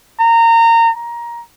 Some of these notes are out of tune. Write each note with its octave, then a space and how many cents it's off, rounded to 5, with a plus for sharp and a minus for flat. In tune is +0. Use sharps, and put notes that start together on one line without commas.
A#5 -25
A#5 +20